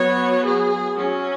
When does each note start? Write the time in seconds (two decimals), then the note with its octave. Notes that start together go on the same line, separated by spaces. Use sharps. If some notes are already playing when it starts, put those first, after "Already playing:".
Already playing: F#3 B3 C#5
0.45 G#4
0.97 F#3 C#4